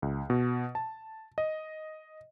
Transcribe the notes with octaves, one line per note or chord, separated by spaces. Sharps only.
C#2
B2
A5
D#5